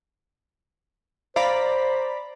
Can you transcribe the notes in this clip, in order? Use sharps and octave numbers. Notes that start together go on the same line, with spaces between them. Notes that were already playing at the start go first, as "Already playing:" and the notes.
C5 D5 F5 A#5 B5